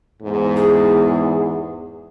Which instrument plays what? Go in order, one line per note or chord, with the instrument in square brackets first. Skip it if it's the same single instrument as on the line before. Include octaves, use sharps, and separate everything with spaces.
[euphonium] E2 [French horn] G#2
[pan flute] G#4